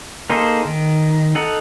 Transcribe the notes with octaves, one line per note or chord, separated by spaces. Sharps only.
A#3 D#4 G#4 A4 C5
D#3
D#4 A4 F#5